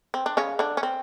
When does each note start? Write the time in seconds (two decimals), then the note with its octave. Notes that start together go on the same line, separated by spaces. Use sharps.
0.14 C4
0.26 D4
0.37 C#3 C#4
0.59 D3 D4
0.77 C#4
0.83 C4